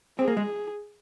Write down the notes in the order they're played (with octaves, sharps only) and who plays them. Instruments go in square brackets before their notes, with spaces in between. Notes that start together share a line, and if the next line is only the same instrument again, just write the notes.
[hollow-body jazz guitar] C4 [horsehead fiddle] G#4
[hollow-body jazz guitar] A#3
G#3